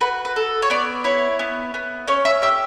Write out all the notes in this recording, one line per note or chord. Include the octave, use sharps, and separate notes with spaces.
F#4 B4
B4
A4
C#5
B3 D5
E4 C#5
B3
B3
C#4 C#5
E5
G4 E5